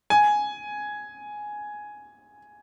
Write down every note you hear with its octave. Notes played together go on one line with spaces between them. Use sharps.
G#5